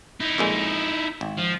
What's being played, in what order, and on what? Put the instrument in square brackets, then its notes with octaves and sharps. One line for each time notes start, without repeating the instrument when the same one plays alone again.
[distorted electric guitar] D#4 E4
[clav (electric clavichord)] F2 A#2 G#3
G#1
[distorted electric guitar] F3